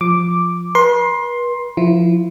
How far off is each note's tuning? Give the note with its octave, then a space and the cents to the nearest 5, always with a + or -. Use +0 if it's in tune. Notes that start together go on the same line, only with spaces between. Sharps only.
F3 +0 D6 +0
B4 -40 C6 +15
F3 +0 E4 +15